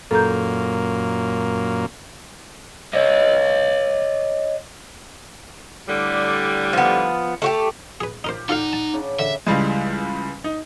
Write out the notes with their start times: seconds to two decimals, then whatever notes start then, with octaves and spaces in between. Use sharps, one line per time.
0.11 F#2 A#2 A#3 A4 A#5 G6
2.93 C#5 D#5
5.88 A2 D3 G3
6.73 F3 B3
7.42 A3 F#4 G4
8.01 G#4 B4
8.24 D#4 F4 G4 A#4 C5
8.49 D#4 F4 A4 D5 F5 F#5
8.73 A5
8.93 C#3 D4 C#5
9.19 D3 E5
9.46 C#2 E3 G3 G#3
10.44 D#4